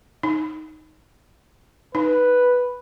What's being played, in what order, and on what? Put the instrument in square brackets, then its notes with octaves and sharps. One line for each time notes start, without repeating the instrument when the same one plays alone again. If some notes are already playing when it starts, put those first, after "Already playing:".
[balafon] D#4
[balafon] D#4 [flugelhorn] B4